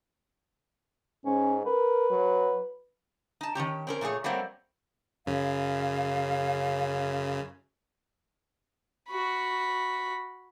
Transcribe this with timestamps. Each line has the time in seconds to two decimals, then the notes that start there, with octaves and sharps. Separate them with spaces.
1.25 G#2 C#4
1.65 A#4 B4
2.10 F#3
3.41 D#4 A5
3.55 D#3 G3 C#4 G4
3.87 C4 C#4 A#4
4.01 A#2 A3 E4 G#4 C#5
4.24 F#3 G3 A3 A#3 C4
5.26 F#2 C#3 F5
9.09 F#4 B5